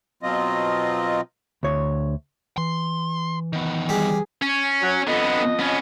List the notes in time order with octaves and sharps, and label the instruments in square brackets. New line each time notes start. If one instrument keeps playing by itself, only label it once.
[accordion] B2 F#3 C4 F4 D#5
[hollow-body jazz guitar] D2 C#5
[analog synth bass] E3 [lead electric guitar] C6
[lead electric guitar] D#3 B3
[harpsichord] G3 [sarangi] G#4
[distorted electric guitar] C#4
[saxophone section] F#3
[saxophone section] F2 D#5 [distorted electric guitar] D3 B3
[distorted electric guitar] B3 C#4